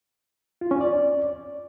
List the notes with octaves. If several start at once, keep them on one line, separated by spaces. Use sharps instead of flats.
F4
C#4
D5